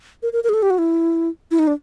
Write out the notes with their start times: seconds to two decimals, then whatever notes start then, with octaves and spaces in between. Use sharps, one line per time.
0.23 A#4
0.33 A#4
0.44 A#4
0.49 G#4
0.54 A4
0.63 G4
0.70 F#4
0.78 E4
1.51 E4
1.59 D#4
1.67 D4